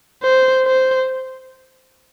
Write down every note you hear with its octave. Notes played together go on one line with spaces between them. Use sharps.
C5
C5